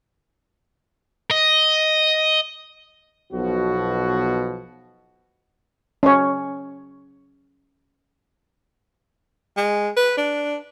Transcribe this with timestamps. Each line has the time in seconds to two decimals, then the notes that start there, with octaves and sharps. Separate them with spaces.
1.31 D#5
3.32 B1 B2 F3 F#4
6.03 C#4 C#5
9.57 G#3
9.97 B4
10.17 D4